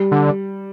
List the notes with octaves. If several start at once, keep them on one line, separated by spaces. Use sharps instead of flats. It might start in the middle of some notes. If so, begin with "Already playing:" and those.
Already playing: G3
D3